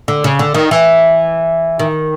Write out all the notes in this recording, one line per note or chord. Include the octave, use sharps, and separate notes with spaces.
D3
C#3
D3
D#3
E3
D#3